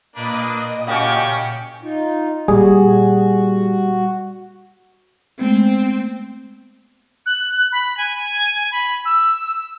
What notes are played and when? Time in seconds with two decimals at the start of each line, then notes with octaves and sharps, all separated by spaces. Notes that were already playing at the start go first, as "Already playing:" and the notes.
0.16 A#2 A#3 D4 B4 D#5 D#6
0.87 C#3 C#4 F#4 G4 G5 C#6
1.83 D#4 F4
2.48 A#2 G3 F#4 G#4
5.39 G#3 A3 B3 C4
7.26 F#6
7.72 B5
7.97 G#5
8.72 B5
9.05 E6